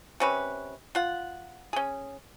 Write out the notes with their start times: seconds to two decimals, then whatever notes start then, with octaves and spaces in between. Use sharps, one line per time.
0.20 C3 C#4 B4
0.95 F4 F#5
1.73 C#4 G#4